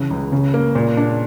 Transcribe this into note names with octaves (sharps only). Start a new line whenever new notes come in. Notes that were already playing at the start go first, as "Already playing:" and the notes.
Already playing: C#3 E3
C#2
C#3
A#3
A#2
D4